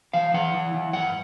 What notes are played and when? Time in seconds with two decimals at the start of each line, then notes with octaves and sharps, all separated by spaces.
0.13 E3 F5
0.34 E3 F#5
0.54 E3
0.74 E3
0.93 G2 F#5